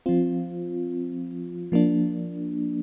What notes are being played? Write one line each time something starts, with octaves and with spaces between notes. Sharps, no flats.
F3 C4 F4
F3 A#3 D4